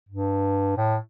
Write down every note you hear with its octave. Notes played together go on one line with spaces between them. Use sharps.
G2
A2